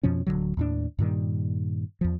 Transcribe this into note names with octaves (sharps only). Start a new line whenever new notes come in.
F2 B2 F3 C#4
D1 D#2 D3 F#3
D#2 A2 D4
G2 A#2 D#3 G3
E2 F3